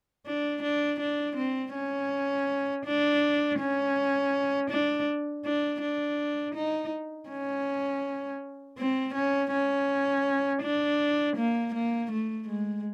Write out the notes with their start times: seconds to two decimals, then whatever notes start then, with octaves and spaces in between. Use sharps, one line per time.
0.26 D4
0.63 D4
1.00 D4
1.37 C4
1.75 C#4
2.86 D4
3.60 C#4
4.71 D4
5.45 D4
5.81 D4
6.55 D#4
7.30 C#4
8.78 C4
9.15 C#4
9.52 C#4
10.63 D4
11.37 A#3
11.75 A#3
12.12 A3
12.49 G#3